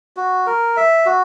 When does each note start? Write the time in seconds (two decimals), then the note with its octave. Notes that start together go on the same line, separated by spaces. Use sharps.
0.17 F#4
0.47 A#4
0.77 E5
1.06 F#4